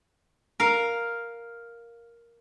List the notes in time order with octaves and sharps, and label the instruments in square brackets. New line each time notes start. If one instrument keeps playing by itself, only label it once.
[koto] A#4 F5